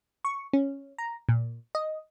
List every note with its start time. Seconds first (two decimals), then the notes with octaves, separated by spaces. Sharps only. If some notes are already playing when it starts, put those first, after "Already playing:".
0.25 C#6
0.53 C#4
0.98 A#5
1.29 A#2
1.75 D#5